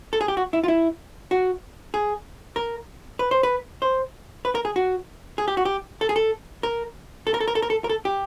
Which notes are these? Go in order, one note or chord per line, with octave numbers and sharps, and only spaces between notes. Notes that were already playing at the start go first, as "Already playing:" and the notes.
A4
G#4
G4
F#4
E4
F4
E4
F#4
G#4
A#4
B4
C5
B4
C5
B4
A#4
G#4
F#4
G#4
G4
F#4
G4
A4
G#4
A4
A#4
A4
A#4
A4
A#4
A4
A#4
A4
A#4
A4
G4